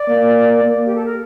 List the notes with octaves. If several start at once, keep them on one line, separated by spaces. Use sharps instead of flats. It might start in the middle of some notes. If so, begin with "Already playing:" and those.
Already playing: D5
A#3
A#3
G4
A4
A#4